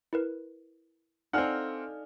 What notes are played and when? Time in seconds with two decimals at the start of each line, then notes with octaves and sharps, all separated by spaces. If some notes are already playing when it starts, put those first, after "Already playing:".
0.13 E4 A#4 B4
1.33 C4 D#4 A4 D5 F5 F#5 G#5 F6